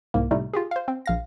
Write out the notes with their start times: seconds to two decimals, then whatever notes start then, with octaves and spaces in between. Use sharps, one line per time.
0.14 C2 G#2 A#3
0.31 A2 C3 G3 A3 D#4
0.53 F4 G4 G#4
0.71 C5 F5
0.88 C4
1.06 A#1 F5 A#6